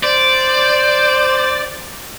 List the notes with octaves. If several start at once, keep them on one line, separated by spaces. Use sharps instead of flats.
C5 D5